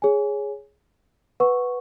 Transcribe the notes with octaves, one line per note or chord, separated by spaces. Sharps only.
G#4 C#5 G#5
B4 F#5 C#6